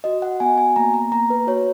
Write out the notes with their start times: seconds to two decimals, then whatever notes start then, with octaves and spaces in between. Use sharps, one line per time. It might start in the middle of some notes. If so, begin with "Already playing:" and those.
0.04 F#4 D#5
0.22 F#5
0.40 B3 G#5
0.58 G#5
0.76 A#3 A#5
0.94 A#5
1.12 A#3 A#5
1.30 B4
1.47 F#4 C#5